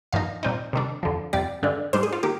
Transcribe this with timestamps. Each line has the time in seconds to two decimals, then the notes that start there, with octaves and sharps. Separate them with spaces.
0.13 G2 F3 A#3 D#4 F5
0.43 A#2 G3 C4 D#4
0.73 C3 D#3 G3 D4
1.03 F2 D3 F3
1.33 F2 C3 G3 D5
1.63 G2 D3 G#3 D4
1.93 G#2 G3 D4 C5
2.03 G#4
2.13 F4
2.23 D#3 A#3 G4